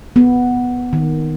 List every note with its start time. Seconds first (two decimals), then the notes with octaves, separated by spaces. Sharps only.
0.16 B3
0.93 D#3